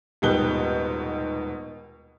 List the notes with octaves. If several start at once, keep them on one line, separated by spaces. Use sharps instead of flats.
D#1 G#2 B2 G4 F#6 G7